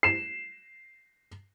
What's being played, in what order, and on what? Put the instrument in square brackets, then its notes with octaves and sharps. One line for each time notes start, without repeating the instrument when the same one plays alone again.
[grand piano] C7 E7